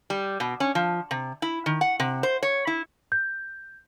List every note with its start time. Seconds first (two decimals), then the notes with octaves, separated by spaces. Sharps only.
0.10 G3
0.40 B2
0.60 C#4
0.75 F3
1.11 C3
1.42 E4
1.66 D#3
1.81 F#5
2.00 C3
2.23 C5
2.43 C#5
2.67 E4
3.12 G6